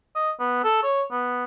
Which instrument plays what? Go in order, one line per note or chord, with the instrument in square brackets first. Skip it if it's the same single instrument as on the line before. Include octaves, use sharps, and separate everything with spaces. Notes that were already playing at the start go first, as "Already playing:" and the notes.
[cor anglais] D#5
B3
A4
C#5
B3